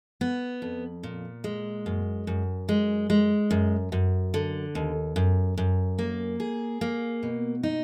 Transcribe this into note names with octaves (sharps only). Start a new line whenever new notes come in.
B3
F2
A#2
G#3
F#2
F#2
G#3
G#3
F#2
F#2
D3
D#2
F#2
F#2
A#3
G#4
A#3
B2
D#4